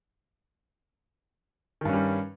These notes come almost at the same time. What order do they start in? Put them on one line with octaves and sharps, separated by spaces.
D#3 G2 C#4 G3